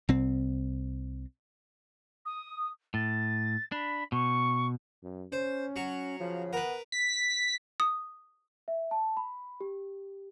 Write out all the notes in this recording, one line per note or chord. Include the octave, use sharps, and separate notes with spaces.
C2 C4
D#6
A2 A6
D4 B5
B2 C#6
F#2
C#4 C5
F#3 C#6
C#3 F3
B3 A#4 B4
B6
D#6
E5
A5
B5
G4